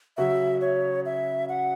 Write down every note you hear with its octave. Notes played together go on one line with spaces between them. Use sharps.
C#3 F#3 C#4 F#4 E5
C#5
E5
F#5